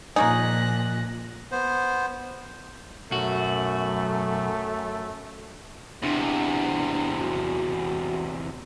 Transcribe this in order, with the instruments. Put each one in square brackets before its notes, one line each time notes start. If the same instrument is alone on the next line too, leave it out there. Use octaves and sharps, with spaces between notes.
[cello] A#2 F3 [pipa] A#3 C#4 G#4 [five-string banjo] D#4 [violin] F#6 A#6
[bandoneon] B3 C5
[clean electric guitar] B1 F#4 [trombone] F#2 [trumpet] A3
[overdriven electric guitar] E2 C3 [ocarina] D4
[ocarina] F#4